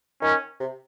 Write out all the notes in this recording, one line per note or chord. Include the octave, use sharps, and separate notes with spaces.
D#3 C#4
C3